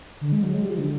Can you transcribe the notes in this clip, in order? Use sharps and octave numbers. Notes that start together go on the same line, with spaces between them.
D3
G#3
F#3
G#3
G3
F3
D3